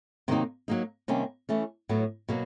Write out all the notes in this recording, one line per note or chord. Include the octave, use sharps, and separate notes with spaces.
C3 D#3 F#3 A#3 D#4
F#3 A#3 D#4
C3 D#3 G3 A#3 C#4
E3 A3 C#4
A2 F#3 B3
B2 F#3 A#3